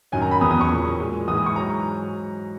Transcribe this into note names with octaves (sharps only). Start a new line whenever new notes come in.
F#2 D#3 F#3 G#5
A#5
B5
E2 C#3 E3 D#6
D#6
C#6
A#2 F#3
A#2 G#3
G#2 E3 G#3 D#6
D#6
C#6
G#2 F#3 A#5